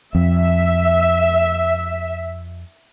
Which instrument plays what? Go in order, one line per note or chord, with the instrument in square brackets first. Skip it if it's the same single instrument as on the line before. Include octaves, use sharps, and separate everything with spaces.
[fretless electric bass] F2 [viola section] E5